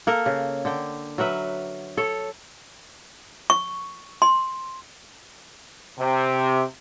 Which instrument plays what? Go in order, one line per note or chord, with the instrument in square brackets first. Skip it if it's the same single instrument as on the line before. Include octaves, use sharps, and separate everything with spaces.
[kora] A#3 A4 A#4
C#3
D3 G5
F#3 A#4 B4 E5
A4 C#5
[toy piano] C#6
C6
[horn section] C3